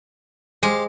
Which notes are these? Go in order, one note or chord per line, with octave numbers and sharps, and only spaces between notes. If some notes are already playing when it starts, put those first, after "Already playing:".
G#3 G4 C5 F5